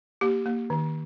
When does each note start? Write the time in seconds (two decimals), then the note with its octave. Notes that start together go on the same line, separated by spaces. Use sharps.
0.21 A#3 G4
0.46 A#3
0.70 D#3